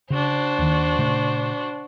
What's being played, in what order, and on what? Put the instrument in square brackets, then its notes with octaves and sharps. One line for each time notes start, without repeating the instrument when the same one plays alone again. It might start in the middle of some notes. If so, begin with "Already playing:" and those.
[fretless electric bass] C#3 [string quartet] D4 F#4 C5
[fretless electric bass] D#2 D#3
A#2 C#3 A3